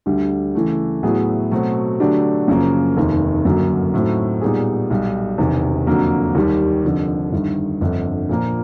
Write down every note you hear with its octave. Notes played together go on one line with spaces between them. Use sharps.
D2 D3 G3
C#3 E3 A3
A2 F#3 B3 E4 G#4
B2 F#3 A3 C4
D3 F#3 A3 D4 G4
F#2 C#3 F3 A#3
F1 D#2 D#3
G1 F#2 D3 F#3 A#3
A2 F#3 A3 C4 D#4
A#2 G3 B3 D#4 G#4
B1 B2 G3
E1 E2 C3 D#3
F2 D3 F#3 A#3
D#2 D#3 G3
F1 F2 D3
G1 G2 D#3
G1 F2 D3
A#2 F3 A#3